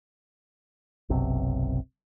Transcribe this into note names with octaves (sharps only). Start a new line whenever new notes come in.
F#1 B1 C3